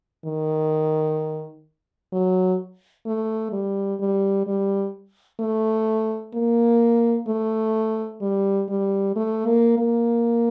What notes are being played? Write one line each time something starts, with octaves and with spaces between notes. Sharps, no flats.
D#3
F#3
A3
G3
G3
G3
A3
A#3
A3
G3
G3
A3
A#3
A#3